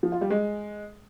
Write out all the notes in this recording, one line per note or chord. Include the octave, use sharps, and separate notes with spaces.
F3
F4
G3
G#3